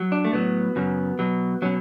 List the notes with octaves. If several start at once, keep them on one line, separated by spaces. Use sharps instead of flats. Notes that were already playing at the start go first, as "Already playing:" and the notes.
Already playing: F#3
D4
A3
A2 F#3 B3
F#2 C#3 F#3
B2 F#3
B2 F#3 C#4